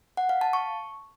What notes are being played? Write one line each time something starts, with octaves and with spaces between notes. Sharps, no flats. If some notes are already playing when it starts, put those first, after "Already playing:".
F#5
F5
A5
C#6